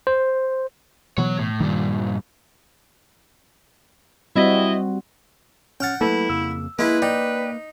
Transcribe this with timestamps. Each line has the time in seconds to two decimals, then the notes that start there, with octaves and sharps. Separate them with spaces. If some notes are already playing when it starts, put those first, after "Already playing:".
0.07 C5
1.18 B2 E3 F#3 B3 C#5
1.39 A2
1.60 G2 A#2 D#3 G3
4.36 G3 C4 E4 F#4 D#5
5.80 C#4 F#5 G5 F6 A6
6.01 F#3 A3 A#3 E4 A4 B4
6.30 F2 C#3 A#3 E6
6.79 G#3 A#3 E4 B4
7.02 D#4 D5 G5